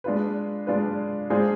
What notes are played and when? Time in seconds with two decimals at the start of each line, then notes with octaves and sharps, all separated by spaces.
0.04 G#3 D4 F4 B4
0.67 G#3 D4 F4 B4
1.30 G#3 D4 F4 G#4 C5